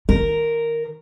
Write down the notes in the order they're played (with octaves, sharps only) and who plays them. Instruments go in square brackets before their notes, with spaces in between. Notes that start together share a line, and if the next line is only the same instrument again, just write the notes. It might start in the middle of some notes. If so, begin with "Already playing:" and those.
[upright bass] D#3 [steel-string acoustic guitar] A#4